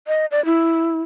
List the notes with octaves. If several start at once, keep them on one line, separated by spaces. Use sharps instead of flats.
D#5
D5
E4